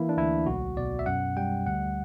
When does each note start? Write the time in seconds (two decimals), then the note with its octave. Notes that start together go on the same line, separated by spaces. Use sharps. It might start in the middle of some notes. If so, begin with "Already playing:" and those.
Already playing: E3 A#3 E4
0.09 D4
0.17 D2 E4
0.46 B1 F#4
0.77 B2 D5
0.99 E5
1.06 F#2 F#5
1.37 G3 G5
1.66 D2 F#5